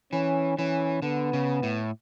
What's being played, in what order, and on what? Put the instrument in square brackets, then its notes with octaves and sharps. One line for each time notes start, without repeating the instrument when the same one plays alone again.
[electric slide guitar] E3 [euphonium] C#4
[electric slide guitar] E3 [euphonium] C#4
[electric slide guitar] D3 [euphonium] B3
[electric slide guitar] C#3
A2